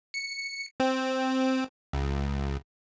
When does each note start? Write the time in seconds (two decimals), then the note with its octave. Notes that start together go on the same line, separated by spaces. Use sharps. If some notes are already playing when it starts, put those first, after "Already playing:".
0.14 C#7
0.80 C4
1.93 C#2